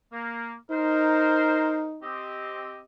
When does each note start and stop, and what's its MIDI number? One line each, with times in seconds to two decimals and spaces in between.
0.13 0.53 58
0.71 2.04 63
0.71 1.88 70
0.71 1.88 72
2.03 2.79 60
2.03 2.79 67
2.03 2.79 75